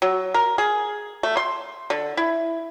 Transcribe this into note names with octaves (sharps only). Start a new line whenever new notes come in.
F#3
A#4
G#4
A3
C6
D3
E4